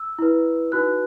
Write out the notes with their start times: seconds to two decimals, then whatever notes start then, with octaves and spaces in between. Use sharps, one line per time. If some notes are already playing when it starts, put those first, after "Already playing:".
Already playing: E6
0.19 E4 B4
0.72 D#4 F#4 B4 F#6